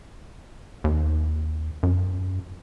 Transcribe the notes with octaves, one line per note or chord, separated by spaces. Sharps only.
D#2
F#2